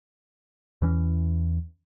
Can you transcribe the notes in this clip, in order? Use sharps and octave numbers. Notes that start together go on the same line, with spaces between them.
E2 E3 C#4